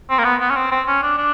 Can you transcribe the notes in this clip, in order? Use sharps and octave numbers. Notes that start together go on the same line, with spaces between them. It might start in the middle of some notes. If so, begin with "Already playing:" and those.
C4
A#3
B3
B3
C#4
C4
C4
C#4
D4
D4